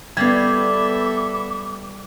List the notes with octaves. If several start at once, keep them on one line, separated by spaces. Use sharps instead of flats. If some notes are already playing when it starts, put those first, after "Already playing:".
G3 B3 A4 E5 F5 D6 G#6